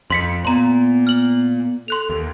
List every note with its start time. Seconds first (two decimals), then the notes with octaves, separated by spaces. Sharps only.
0.10 F2 C6 B6 C#7
0.45 A#2 B3 A#5 C6
1.07 F6 F#7
1.88 A4 C6 F#6 F7
2.10 D#2